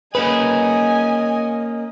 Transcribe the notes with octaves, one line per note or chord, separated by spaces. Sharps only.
A#3 C#4 G#4 B4 D#5 G#5